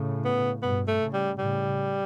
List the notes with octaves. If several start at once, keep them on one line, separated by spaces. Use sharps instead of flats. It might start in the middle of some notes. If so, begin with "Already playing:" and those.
Already playing: A2 C#3
B3
G2 B2 B3
A3
A2 C#3
G3
A2 C#3 G3